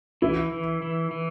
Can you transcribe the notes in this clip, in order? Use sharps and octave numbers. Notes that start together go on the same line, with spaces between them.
E3 E4
E3
E3
E3